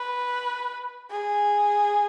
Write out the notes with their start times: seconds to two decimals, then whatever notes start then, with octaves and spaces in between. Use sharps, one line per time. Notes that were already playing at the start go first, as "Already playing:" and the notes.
Already playing: B4
1.11 G#4